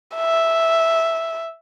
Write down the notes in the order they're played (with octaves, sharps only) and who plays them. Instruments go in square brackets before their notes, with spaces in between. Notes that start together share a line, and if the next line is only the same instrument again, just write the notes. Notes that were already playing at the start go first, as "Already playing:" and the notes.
[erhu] E5